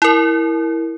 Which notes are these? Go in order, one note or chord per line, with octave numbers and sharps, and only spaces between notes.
E4 A#4